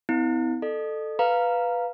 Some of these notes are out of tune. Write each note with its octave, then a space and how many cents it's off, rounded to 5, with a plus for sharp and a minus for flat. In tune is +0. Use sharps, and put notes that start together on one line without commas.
B3 +45 E4 -30
A4 +0 D#5 -45
B4 +0 F5 +0 A#5 +0